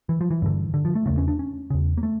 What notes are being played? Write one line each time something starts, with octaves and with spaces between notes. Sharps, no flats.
E3
F3
E3
G2 D3
D3
F3
A3
E2 C#3 A3
C#4
D4
C#4
E2 C#3
A#3
A3